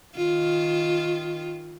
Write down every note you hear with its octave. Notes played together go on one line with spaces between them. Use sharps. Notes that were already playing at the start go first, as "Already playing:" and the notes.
D#3 F4